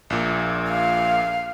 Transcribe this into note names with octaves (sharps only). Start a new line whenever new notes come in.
A#1 A#2
F5